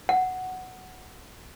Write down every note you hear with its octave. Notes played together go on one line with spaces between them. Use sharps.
F#5